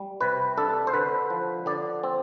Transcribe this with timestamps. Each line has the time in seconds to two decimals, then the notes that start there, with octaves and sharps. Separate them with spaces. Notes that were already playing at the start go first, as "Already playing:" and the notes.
Already playing: G3
0.21 C3 B4
0.57 D4 A4
0.87 C5
0.94 D3 B4
1.30 F3
1.66 D3 D5
2.03 C4